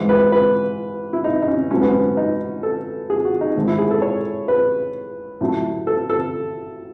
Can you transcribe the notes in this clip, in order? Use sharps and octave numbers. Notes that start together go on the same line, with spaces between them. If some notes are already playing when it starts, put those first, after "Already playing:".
Already playing: G#2 E3 G#3
B4
B4
E4
D#4
D#4
C#4
G#2 F#3 A3 C#4
B3
C#4
D#4
A4
G#4
F#4
D#4
G#2 D#3 A3
E4
G#4
A4
C#5
B4
A2 F#3 A3
A4
A4